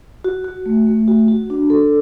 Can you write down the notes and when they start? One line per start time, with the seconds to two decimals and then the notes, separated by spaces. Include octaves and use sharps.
0.24 F#4
0.44 F#4
0.66 A3
0.87 A3
1.08 F#4
1.28 F#4
1.50 D4
1.70 A4